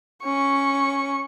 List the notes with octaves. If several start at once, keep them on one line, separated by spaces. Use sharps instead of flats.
C#4 C#6